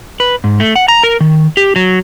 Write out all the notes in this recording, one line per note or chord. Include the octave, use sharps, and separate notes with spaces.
B4
G#2
A3
F#5
A#5
A#4
D#3
G4
F#3